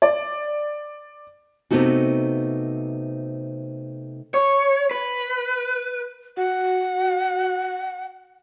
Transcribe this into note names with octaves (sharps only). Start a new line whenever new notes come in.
D5
C3 F#3 A3 B3 D#4 F#4
C#5
B4
F#4 F#5